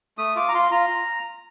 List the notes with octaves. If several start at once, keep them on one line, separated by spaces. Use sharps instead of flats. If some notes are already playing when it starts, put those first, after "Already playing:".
A3 D#6
F4 D6
A#5
F4 C6
F4 A#5